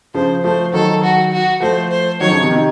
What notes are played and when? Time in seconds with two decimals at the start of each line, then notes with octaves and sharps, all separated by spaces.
0.14 C#3 F3 C5
0.44 F3 A3 C5
0.74 D#3 F#3 A4
1.04 F#4
1.33 F#4
1.62 F3 A3 C5
1.91 C5
2.21 D#3 F#3 C#5
2.31 C#3 F3
2.41 C3 D#3
2.51 C3 D#3